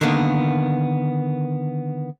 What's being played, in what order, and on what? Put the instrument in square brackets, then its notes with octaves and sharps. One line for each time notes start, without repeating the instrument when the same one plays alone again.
[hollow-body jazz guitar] D3 D#3 A#3 B3